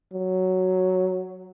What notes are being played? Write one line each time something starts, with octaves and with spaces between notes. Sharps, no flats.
F#3